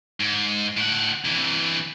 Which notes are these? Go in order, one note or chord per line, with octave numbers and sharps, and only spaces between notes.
G#2
A2 F#5
C3 E3